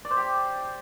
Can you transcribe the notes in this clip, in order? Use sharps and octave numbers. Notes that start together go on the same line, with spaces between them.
D5
C5
G4